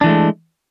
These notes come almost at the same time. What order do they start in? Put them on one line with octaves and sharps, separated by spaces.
D4 E3 A3 G#3